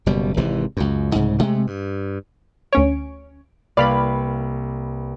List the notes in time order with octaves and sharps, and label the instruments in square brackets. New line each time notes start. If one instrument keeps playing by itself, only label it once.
[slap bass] F#1 B2 G3
G#1 C3 E3
C#2 F#2
C2 G#2 C#3
C3 G#3 A3
G2
[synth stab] D2 C#4 C#5 [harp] D7
[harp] C2 A#3 B4 [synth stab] D5 F5 B5